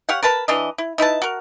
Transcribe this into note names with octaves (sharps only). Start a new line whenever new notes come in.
G4 C#5 F5 F#5
A#4 B4 A5 B5
E3 D4 D#5
E4
D#4 E4 B4 A5
F#4 A#4